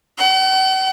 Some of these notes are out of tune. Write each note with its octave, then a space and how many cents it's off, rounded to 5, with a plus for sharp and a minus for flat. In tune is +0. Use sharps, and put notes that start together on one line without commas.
F#5 +45